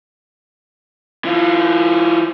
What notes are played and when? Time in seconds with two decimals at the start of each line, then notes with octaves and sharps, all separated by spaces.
1.25 E3 F4